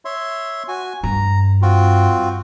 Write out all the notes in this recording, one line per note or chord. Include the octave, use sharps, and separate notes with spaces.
C#5 E5 C6
F#4 G#5
G2 A#5
C4 F4 F#4